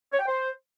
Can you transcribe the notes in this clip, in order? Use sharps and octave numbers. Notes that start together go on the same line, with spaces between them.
C#5
G5
C5